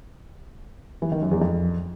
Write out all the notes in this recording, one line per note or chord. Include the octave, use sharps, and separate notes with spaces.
E3
D#3
F#2
E2
F2